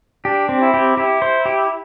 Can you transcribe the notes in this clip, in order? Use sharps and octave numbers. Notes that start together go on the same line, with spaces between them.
D4 G4
C4
E4
G4
E4 G4
C5
G4